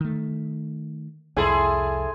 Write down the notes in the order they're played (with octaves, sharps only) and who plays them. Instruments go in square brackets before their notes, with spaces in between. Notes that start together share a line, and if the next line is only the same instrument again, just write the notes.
[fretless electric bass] D#3 A3
[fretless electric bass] C2 F2 [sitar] E4 G#4 A4 [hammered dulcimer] G#5 C6